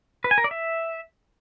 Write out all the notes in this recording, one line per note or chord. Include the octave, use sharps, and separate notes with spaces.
B4
G#5
A#4
D5
E5